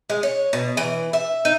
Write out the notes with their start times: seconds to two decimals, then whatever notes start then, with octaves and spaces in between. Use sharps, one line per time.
0.10 G#3
0.23 C#5
0.53 B2
0.77 E3
1.13 E5
1.45 D#4